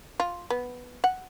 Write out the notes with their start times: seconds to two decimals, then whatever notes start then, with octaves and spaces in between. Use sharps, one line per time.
0.20 F4
0.50 B3
1.04 F#5